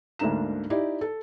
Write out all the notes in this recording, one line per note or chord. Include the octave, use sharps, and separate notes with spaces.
D2 G#2 A#3 D4 A#5 E7
D#4 E4 G4 D5
A4